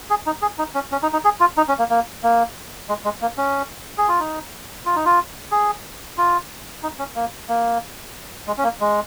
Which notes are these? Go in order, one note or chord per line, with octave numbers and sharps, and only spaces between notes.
G#4
D#4
G#4
D#4
C#4
C#4
D#4
D#4
G#4
F4
D#4
C#4
A#3
A#3
A#3
G#3
G#3
A#3
C#4
G#4
F4
D#4
F4
D#4
F4
G#4
F4
D#4
C#4
A#3
A#3
G#3
C#4
A#3
G#3